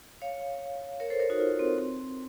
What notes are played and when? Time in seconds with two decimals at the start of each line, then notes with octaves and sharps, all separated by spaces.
0.21 C#5 F5
1.00 A#4 C#5
1.10 A4 C5
1.19 A#4 C#5
1.30 D#4 F#4
1.40 F4
1.59 C4
1.78 C4